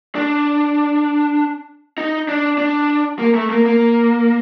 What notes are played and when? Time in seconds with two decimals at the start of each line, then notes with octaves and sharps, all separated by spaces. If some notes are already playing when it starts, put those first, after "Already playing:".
0.15 D4
1.98 D#4
2.28 D4
2.58 D4
3.19 A#3
3.35 A3
3.51 A#3
3.66 A#3